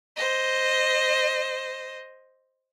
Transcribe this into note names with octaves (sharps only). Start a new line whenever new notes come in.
C5 D#5